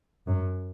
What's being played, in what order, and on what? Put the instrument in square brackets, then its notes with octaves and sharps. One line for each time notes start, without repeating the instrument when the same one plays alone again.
[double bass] F#2